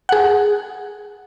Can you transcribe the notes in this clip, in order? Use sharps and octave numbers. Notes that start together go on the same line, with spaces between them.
G#4 F#5